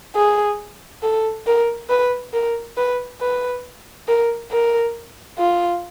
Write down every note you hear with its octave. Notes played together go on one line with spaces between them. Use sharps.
G#4
A4
A#4
B4
A#4
B4
B4
A#4
A#4
F4